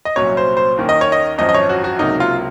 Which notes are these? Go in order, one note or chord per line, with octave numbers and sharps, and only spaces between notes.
D#5
C2 A#2 F#3 C#4 C#5
C5
C5
D#2 D#3 A#3 C#4
D#5
C#5
D#5
G#1 F#2 F3 D#5
D#5
C#5
F#4
F#4
C#2 C3 F#3 A#3 D#4
F4